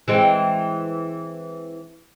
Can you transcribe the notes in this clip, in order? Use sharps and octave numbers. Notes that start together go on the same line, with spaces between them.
E3 G#3 C4